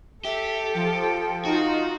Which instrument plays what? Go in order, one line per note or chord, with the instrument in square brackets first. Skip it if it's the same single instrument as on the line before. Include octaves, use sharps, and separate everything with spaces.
[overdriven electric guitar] G4 [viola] A4 [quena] E5
[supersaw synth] F3 [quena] G5
[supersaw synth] D#4 F4 [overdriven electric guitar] F#4